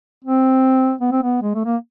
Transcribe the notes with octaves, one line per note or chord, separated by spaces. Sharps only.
C4
B3
C4
B3
G#3
A3
A#3